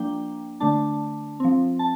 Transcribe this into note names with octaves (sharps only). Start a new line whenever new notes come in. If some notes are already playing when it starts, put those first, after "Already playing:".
Already playing: F3 A#3 D4 G5
D3 A3 D4 A5
F3 C4
A5